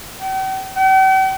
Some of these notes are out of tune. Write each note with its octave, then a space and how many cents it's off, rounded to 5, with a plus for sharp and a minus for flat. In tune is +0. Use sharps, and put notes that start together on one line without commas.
G5 -45
G5 -45